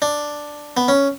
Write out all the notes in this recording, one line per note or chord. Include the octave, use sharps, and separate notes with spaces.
D4
B3
C#4